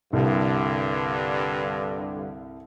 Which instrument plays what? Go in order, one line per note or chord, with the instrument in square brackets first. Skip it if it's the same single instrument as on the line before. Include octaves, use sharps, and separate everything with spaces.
[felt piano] C2 [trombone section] G2 D3